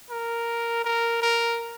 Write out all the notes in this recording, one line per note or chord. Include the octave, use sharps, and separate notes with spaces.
A#4
A#4
A#4